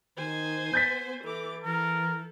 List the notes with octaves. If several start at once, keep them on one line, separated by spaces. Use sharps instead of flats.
D#3 C5 G#5
B3 G6 A6 B6
E3 A4 D6
E3 A4 A#4